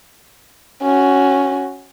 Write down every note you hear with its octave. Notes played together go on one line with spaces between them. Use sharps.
C#4 F#4